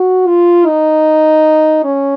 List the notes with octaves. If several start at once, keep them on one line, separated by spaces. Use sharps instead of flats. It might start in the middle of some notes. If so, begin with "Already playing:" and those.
Already playing: F#4
F4
D#4
C#4